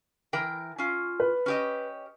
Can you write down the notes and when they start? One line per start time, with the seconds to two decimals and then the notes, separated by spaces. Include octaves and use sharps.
0.33 E3 A#4 G5
0.78 C#4 F4
1.20 B4
1.46 C#4 G4 D#5